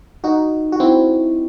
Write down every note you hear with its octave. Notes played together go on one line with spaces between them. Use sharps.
D#4 F#4
F#4
C4 E4